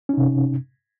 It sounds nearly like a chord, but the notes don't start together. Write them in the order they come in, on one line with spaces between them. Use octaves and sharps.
C#4 D#4 C3